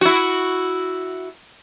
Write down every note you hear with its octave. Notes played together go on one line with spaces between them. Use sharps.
E4 F#4